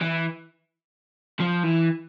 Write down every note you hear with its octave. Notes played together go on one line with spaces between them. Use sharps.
E3
F3
E3